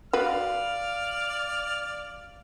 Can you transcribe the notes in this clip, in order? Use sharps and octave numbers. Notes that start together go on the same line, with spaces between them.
F#4 B4 D5 F5 F6